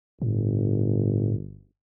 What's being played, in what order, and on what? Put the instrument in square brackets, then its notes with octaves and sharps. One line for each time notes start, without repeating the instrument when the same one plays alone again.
[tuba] G1 [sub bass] A2